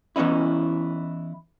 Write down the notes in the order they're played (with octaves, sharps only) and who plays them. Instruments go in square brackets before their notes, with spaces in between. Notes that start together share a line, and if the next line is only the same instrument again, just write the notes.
[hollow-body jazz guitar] E3 B3 C#4 D#4 E4